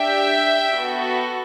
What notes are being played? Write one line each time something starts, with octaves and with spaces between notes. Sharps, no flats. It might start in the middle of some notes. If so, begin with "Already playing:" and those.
Already playing: D4 G4 E5 G5
B3 F#4 A4